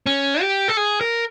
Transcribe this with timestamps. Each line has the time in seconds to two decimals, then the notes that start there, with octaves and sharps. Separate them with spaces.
0.06 C#4
0.41 G4
0.68 A4
0.77 G#4
1.01 A#4